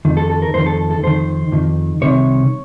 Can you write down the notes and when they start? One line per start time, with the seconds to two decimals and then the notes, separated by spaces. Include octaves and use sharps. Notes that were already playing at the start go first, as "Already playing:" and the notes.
0.05 F2 D#3
0.17 A4
0.30 A4
0.42 A#4
0.54 F2 D#3 C5
0.66 A4
0.91 A4
1.03 F2 D#3 C5
1.52 F2 D#3
2.01 C2 C3 D#3 C#5